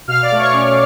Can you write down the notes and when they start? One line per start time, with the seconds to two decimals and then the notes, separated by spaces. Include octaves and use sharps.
0.08 B2 F5 F6
0.22 D5 D6
0.31 A3
0.38 C#5 C#6
0.53 C#4